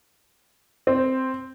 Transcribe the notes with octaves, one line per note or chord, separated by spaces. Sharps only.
C4